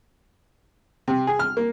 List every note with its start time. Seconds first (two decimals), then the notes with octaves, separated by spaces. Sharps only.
1.08 C3
1.27 G#4
1.39 F6
1.57 A#3